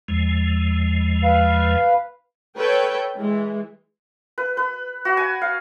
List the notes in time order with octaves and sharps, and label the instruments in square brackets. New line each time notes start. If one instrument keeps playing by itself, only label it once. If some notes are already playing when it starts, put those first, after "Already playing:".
[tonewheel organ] E2 F3 G#3
[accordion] B4 F5
[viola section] A4 B4 C#5 G5
E3 G#3
[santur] B4
B4
F#4
G#5
F5